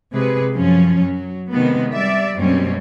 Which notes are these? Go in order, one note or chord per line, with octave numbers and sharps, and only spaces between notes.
C3 G#3 G#4 B4
F#2 F3 C#4
F#3
C3 D#3 G#3 B3
G3 D5 E5
F#2 B2 G3 A#3 C4 C#4